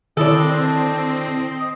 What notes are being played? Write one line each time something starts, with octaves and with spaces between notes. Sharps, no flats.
D#3 C4 D4 E4 A4 D#5